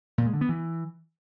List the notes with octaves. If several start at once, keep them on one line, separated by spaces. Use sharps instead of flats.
A#2
G#3
D3
B3
E3